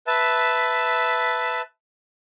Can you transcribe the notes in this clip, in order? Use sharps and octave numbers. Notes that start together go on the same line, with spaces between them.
B4 E5 A5